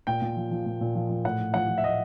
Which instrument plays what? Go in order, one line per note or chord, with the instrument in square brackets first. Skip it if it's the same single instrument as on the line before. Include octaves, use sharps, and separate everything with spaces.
[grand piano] A#2 G5
A#2
F3
F3
A#2
A#2
F3
F3
A2 F#5
A2
F3 F#5
F3
E5
A2 D#5